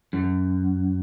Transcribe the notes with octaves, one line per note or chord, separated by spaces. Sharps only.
F#2